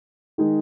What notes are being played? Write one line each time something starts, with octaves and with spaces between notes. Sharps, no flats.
D#3 G#3 D#4 G#4